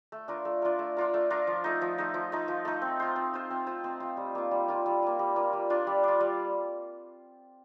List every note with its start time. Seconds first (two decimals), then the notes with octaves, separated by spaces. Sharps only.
0.12 A3
0.28 D4 F4 A#4
0.45 A3
0.62 D4 F4 A#4
0.79 A3
0.97 D4 F4 A#4
1.14 A3
1.30 D4 F4 A#4
1.47 F3
1.64 A3 D#4
1.81 F3
1.98 A3 D#4
2.14 F3
2.32 A3 D#4
2.48 F3
2.65 A3 D#4
2.82 C4
3.00 F4 C5
3.16 C4
3.34 F4 C5
3.50 C4
3.66 F4 C5
3.84 C4
4.00 F4 C5
4.17 G3
4.35 A#3 F4
4.51 G3
4.68 A#3 F4
4.86 G3
5.02 A#3 F4
5.19 G3
5.36 A#3 F4
5.53 G3
5.70 D4 F4
5.87 G3
6.03 D4 F4
6.20 G3